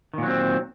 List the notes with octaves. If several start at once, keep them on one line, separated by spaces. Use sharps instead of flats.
A#2 D#3 F#3 C4